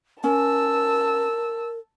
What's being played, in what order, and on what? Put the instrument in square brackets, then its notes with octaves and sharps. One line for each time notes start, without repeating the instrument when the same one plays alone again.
[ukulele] C#4 [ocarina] A#4 [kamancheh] A5 E6